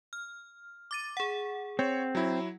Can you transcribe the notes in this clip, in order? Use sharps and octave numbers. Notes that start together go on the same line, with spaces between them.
F6
D6 A6 D#7
G#4 F#5
C4 C#5
F#3 E4